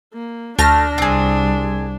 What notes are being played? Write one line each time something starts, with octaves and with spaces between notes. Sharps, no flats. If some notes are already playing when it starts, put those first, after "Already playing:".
A#3
D2 A3 D4 F6 A#6
C2 C4 G#4